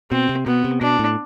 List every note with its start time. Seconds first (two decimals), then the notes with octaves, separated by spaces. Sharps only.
0.11 B2 C4
0.29 C3
0.46 B2 B3
0.64 C3
0.81 B2 D4
0.99 A2